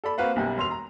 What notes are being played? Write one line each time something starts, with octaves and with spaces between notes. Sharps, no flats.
A4 D5 B5
A#3 C4 F#4 B4 F5 F#5
B1 F#2 G3 G5 G#5
E1 C6 F7
A#5